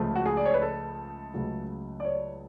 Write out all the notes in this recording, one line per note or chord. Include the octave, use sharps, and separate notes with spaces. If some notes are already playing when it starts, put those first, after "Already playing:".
Already playing: C#2 C#3 F3 A3
F#4
G#4
D5
C#5
B4
A4
C#2 C#3 F#3 A3
D5
C#5